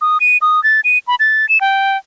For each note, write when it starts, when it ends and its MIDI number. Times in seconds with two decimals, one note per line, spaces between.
0.01 0.18 87
0.20 0.37 99
0.42 0.62 87
0.64 0.81 93
0.84 0.98 99
1.08 1.15 83
1.20 1.48 93
1.49 1.61 100
1.61 1.97 79